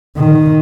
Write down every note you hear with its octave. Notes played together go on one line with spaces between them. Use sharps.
D#3